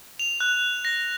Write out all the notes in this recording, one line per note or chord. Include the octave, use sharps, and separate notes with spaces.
F7
F#6
A#6